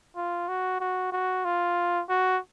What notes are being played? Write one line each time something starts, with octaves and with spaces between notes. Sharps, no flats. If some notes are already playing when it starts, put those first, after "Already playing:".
F4
F#4
F#4
F#4
F4
F#4